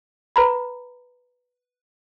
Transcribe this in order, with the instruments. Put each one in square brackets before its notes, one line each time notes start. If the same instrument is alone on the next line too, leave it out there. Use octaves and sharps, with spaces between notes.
[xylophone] B4 A#5 B5